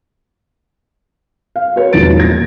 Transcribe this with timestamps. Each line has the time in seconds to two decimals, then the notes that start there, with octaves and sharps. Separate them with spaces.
1.56 F5
1.76 F#4 A#4 B4 C#5
1.93 E1 E2 D#3 F3 A6 D7
2.18 A#2 G#6 A#6